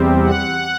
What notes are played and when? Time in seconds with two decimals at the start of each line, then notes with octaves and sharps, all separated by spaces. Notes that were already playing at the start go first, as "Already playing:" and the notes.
Already playing: E2 C3 G3 C4
0.24 F#5